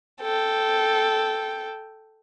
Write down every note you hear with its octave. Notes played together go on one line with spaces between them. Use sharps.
A4 G5